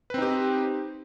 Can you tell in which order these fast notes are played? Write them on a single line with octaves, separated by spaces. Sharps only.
B4 C4 D#4 G4